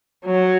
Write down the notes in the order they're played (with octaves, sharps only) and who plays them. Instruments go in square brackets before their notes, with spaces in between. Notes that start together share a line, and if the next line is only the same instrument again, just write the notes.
[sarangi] F#3